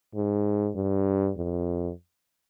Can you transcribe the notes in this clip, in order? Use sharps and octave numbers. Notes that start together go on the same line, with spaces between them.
G#2
G2
F2